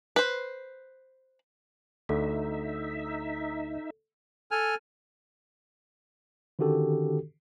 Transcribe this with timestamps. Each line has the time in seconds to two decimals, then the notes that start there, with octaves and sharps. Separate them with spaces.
0.16 B4 C5
2.09 D2 D#4 A4 E5
4.51 A4 G#5 F6
6.59 D3 D#3 C#4 F#4 G4 A4